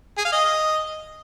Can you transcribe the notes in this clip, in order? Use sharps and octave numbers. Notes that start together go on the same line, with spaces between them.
G#4
F5
D#5